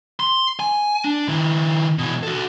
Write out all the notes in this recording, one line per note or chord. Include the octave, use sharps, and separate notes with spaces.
C6
G#5
D4
D#3 E4
B2 E3
F#4 A4